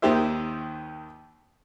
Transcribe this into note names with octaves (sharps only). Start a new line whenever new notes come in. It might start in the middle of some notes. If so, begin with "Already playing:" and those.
D#2 D#3 G4 C5 E5